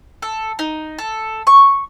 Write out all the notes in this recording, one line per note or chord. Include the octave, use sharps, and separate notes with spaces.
A4
D#4
A4
C#6